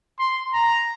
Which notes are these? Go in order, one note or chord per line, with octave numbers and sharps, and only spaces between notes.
C6
A#5